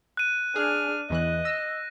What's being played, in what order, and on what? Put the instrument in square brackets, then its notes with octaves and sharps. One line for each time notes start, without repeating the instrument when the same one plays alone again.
[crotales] F#6 D#7
[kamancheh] D4 F6 [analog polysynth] G#4
[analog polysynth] E2 E3 F#6 [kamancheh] D#5
[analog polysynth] E6 [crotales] A#6